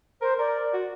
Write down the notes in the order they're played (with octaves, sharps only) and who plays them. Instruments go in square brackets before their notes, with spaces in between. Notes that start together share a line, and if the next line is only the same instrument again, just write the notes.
[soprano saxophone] A#4 [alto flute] C5
[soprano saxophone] A#4 [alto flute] D5
[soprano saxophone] F#4